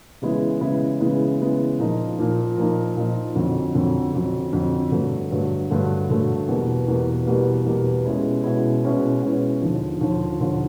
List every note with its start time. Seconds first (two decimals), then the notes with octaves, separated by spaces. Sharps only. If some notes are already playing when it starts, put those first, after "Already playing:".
0.22 C#3 E3 G#3 B3 E4
0.61 C#3 E3 G#3 B3 E4
1.00 C#3 E3 G#3 B3 E4
1.40 C#3 E3 G#3 B3 E4
1.79 A#2 F3 A#3 D#4
2.18 A#2 F3 A#3 D#4
2.57 A#2 F3 A#3 D#4
2.96 A#2 F3 A#3 D#4
3.35 F2 D3 F#3
3.75 F2 D3 F#3
4.13 F2 D3 F#3
4.53 F2 D3 F#3
4.92 G2 D3 F#3 A3
5.31 G2 D3 F#3 A3
5.70 G2 D3 F#3 A3
6.09 G2 D3 F#3 A3
6.49 E2 B2 G3 A#3
6.88 E2 B2 G3 A#3
7.27 E2 B2 G3 A#3
7.66 E2 B2 G3 A#3
8.05 B2 G#3 C#4 E4
8.44 B2 G#3 C#4 E4
8.84 B2 G#3 C#4 E4
9.22 B2 G#3 C#4 E4
9.62 D#2 D3 F3
10.00 D#2 D3 F3
10.40 D#2 D3 F3